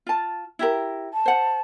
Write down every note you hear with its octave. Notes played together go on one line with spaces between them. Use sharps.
F4 A5
E4 G4 A#4
A5
C5 F#5